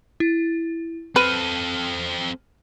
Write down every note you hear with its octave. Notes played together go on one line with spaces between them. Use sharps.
E4
C4 A4 B4 F6 D#7